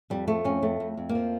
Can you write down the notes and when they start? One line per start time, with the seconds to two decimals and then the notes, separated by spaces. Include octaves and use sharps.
0.10 F2 G3
0.27 F3 A3
0.44 F2 C#4
0.62 F2 A3
0.80 F2
0.97 F2
1.09 A#3
1.15 F3